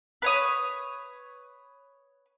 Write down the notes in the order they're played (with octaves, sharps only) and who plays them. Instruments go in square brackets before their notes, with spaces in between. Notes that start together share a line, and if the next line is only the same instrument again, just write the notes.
[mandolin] B4 C#5 D#6